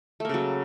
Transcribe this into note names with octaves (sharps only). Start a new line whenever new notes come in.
C#3 F#3 A3 A#3